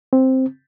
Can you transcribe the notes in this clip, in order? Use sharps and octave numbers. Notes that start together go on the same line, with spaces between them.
C4